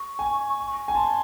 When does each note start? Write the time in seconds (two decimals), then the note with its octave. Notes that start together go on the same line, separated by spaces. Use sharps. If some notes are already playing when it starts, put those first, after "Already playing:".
Already playing: C#6
0.19 G#5
0.88 G#5
0.95 A5 C6